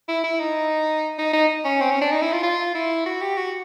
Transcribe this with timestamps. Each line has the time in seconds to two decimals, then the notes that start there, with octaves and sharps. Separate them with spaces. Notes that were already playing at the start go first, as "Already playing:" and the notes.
0.08 E4
0.24 E4
0.40 D#4
1.18 D#4
1.33 D#4
1.65 C#4
1.81 C4
1.91 C#4
2.01 D4
2.12 D#4
2.22 E4
2.32 F4
2.43 F4
2.75 E4
3.06 F#4
3.21 G4
3.37 F#4